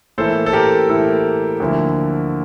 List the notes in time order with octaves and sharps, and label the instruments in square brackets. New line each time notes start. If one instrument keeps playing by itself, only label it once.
[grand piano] A2 E3 A#3 E4 A4 C5
A4
G4 A#4
A2 E3 A#3 E4 A4
D2 D3 F3 A#3 E4